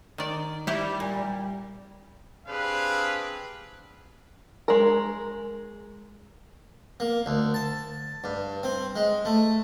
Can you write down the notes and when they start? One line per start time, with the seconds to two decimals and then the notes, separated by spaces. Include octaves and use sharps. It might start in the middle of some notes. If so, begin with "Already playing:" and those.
0.18 D#3 D5
0.67 G3 E4 G4
1.00 A#2
2.47 C4 D4 G4 G#4 B4 F5
4.68 G#3 A#4
7.00 A#3
7.26 D2
7.54 A5
8.24 G2
8.63 C4
8.96 G#3
9.25 A3